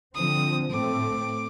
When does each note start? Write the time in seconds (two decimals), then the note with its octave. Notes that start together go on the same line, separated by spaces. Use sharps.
0.15 D3 F3 C4 D#6
0.71 A2 A3 C4 D6